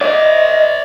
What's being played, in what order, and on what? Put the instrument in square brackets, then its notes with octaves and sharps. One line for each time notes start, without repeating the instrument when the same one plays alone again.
[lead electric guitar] C5 D5 [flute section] D#5